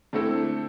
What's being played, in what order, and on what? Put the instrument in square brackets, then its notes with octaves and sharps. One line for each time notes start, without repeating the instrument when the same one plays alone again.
[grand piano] D3 A3 C4 E4 A4